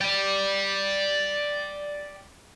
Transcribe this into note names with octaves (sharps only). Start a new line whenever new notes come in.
D5 G5